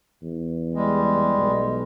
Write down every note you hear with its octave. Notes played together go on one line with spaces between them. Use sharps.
E2
G3 G#3
B1